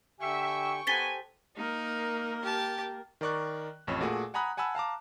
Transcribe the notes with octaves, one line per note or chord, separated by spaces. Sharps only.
D3 G4 E5 G5 G#5 C#6
B3 G4 A4 C5 G#5 A6 B6 G7
A#3 D#4 A#4
G4 A5
D#3 A#4 D5 C#6 F#6
A1 F2 C#5 E7
A#2 A3 F#4 G#4
F#5 G#5 A#5 B5 D#6 F#6
F#5 G#5 A5 B5 E6
F5 A5 A#5 D6